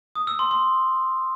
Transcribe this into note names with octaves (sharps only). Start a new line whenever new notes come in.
D#6
E6
C6
C6